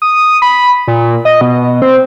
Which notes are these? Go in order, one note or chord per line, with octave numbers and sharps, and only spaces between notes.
D#6
B5
A#2
D#5
B2
C4